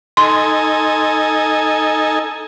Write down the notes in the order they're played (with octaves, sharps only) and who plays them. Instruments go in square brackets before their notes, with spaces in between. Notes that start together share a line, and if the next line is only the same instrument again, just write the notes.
[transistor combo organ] D#4 A4 G#5 [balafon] C6